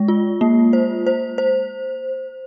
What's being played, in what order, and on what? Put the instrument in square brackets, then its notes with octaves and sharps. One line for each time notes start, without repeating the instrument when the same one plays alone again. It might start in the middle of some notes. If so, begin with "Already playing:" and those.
Already playing: [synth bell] G#3
F4
A#3
C5
C5
C5